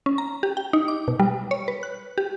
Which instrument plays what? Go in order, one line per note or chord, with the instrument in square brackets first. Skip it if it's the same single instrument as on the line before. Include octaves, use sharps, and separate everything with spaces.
[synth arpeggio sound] C#4
A#5
G4
G5
D#4
D6
B2
G3
C#5
B4
F#6
G4